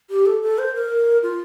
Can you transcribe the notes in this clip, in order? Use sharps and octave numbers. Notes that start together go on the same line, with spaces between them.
G4
A4
A4
C5
A#4
F4